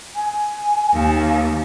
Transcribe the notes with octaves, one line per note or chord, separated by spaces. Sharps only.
G#5
D#2